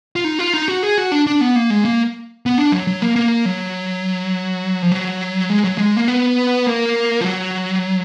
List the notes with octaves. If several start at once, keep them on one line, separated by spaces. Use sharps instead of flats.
F4
D#4
F4
D#4
F#4
G#4
F#4
D4
D4
B3
A#3
G#3
A#3
B3
D4
F#3
F#3
A#3
A#3
F#3
F3
F#3
G#3
F#3
G#3
A#3
B3
A#3
F3
F#3